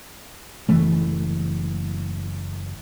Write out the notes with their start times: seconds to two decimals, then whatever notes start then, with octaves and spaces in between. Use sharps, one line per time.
0.69 F#1 E3 A3